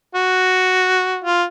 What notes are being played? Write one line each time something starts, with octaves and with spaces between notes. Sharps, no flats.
F#4
F4